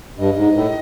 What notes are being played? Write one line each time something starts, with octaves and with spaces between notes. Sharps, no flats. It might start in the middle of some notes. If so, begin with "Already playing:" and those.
G2 D#5
G#2
A2